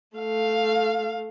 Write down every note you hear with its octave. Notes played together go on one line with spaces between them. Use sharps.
A3 F5